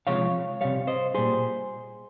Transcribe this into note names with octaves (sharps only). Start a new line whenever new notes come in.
C3 F3 G#3 C#5 F5
C3 G3 C#5 F5
C5 D#5
A#2 G3 G#4 C5